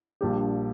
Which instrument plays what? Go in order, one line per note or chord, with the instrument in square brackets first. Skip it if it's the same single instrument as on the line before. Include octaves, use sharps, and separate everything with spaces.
[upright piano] A#1 A#2 G3 D4 G4